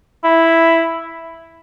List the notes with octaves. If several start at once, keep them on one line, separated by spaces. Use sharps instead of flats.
E4